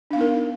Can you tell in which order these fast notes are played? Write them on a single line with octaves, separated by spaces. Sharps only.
D4 F5 B3 D#4 A#4